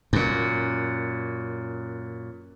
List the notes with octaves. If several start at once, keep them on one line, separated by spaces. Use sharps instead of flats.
F#2 A#2